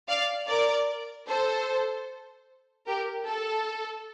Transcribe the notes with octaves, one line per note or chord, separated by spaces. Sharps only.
D5 F5
A#4 D5
A4 C5
G4 A#4
A4